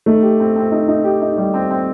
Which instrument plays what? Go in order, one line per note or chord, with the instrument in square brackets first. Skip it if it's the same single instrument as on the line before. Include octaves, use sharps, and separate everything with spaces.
[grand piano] A3 [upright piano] D#4
[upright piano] G4
C4
C4
D#4
D#4
G4
D#4
G3
C4
C4